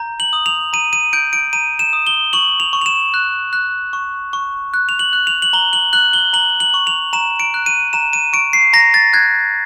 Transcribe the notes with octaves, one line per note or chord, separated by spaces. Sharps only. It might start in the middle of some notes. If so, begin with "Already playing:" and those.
Already playing: A#5 G6
F#7
D#6
F7
A#5 D#7
D#7
G6 D7
D7
A#5 D#7
E7
D#6
G7
C#6 F#7
F7
C#6
F7
E7
F#6
F#6
C#6
C#6
F#6
F7
F#7
F#6
F7
F#7
A#5 G7
F#7
F#6 F#7
G7
A#5 F#7
F#7
C#6
F7
A#5 E7
D7
F#6
D#7
A#5 E7
D#7
C#6 D7
C7
A#5 A#6
A6
F#6 G#6